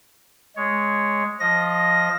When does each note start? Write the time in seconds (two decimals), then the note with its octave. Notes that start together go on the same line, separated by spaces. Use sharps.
0.56 G#3 C#5
1.40 F3 D#5 A#6